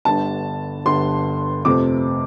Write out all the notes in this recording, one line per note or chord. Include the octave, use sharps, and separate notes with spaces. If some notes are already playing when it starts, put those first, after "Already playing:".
G1 G2 D3 A5
G1 G2 D3 C6
F2 C3 A3 C4 D6